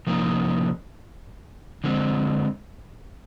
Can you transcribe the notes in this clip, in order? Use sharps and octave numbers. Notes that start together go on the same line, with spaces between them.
C3 F3 A#3 D#4
D3 G#3 C4